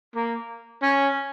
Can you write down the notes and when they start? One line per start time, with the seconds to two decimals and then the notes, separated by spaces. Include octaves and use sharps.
0.15 A#3
0.82 C#4